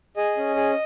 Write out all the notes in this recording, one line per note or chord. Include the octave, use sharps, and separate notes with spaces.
G#4 D#5
C#4
G#4